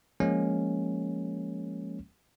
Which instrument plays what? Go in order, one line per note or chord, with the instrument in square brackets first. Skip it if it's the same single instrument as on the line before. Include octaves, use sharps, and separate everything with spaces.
[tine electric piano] F3 G#3 A#3 C#4